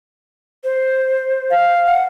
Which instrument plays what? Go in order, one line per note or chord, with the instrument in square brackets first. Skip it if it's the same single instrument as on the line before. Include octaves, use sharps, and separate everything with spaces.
[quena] C5
[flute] F5
[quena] F#5